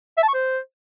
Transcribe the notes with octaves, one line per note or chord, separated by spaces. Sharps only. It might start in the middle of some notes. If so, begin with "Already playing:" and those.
E5
A5
C#6
C5